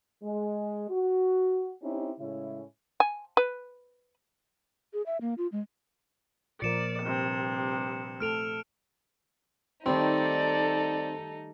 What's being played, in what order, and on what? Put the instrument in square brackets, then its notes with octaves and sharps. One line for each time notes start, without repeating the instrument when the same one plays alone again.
[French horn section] G#3
F#4
C4 C#4 D#4 E4 G4
A2 C#3 G#3 C#4 E4
[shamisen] G#5
B4
[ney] G#4
E5
A#3
F4
G#3
[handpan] A#2 F3 A#4 [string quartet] D5 [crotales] C#7 E7
[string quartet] G2 C3
[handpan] A3 A4 [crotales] F6 D7 F7
[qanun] D#3 G3 A3 [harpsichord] C4 [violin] D#4 A4 [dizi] D5